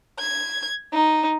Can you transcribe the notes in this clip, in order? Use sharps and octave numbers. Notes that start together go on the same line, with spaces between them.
G#6
D#4